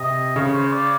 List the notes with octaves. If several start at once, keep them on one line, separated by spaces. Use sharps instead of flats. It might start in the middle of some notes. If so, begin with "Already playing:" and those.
Already playing: C3 D#5
C#3 C#5
C5
C#5
D5